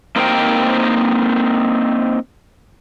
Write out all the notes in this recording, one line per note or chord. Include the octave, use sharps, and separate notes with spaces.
A#3 C4 D#4 A#4 C5 G5